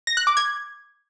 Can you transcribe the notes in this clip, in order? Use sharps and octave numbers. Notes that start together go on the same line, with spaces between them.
A#6
F#6
D6
G#6